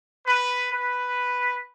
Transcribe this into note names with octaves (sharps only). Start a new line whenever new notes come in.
B4
B4